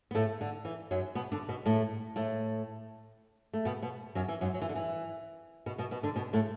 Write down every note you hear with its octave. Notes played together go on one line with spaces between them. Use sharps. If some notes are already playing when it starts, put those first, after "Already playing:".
B3
A2 A3
D3
E3
F#2 F#3
B2 B3
D3 D4
B2 B3
A2 A3
A2 A3
A3
B2 B3
B2 B3
F#2 F#3
E3
F#2 F#3
F#3
E3
D3
E3
B2 B3
B2 B3
B2 B3
D3 D4
B2 B3
A2 A3